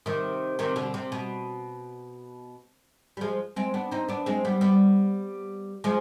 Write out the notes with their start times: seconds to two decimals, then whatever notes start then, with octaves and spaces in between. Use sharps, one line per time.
0.06 C3 D#3
0.59 C3 D#3
0.76 B2 D3
0.94 C3
1.12 B2
3.17 G3
3.21 F3 G#3
3.56 G#3 C4
3.74 B3 D4
3.91 C4 D#4
4.09 B3 D4
4.26 G#3 C4
4.45 G3 B3
4.61 G3 B3
5.84 F3 G#3